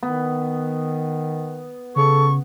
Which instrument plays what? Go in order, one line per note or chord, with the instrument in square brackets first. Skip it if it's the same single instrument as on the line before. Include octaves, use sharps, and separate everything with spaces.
[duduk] D#3 [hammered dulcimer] B3
[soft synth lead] C#3 [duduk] A4 [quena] C#6